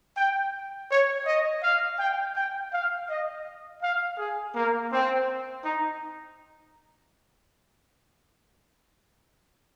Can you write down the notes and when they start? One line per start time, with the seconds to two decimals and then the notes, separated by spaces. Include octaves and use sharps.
0.17 G5
0.90 C#5
1.26 D#5
1.63 F5
1.99 G5
2.35 G5
2.72 F5
3.09 D#5
3.82 F5
4.18 G#4
4.55 A#3
4.92 C4
5.64 D#4